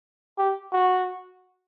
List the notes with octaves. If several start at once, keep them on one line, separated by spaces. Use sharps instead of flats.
G4
F#4